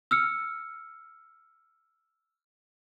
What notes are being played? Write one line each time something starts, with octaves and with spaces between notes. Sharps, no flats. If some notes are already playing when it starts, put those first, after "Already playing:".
E6 F6 C#7